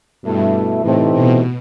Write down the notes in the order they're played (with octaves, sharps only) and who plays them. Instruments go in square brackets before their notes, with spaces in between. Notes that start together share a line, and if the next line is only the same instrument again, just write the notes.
[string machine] G2 [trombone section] B2 A3 E4
[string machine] A2 [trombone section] C3 E3 A3 C4 D#4
[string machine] B2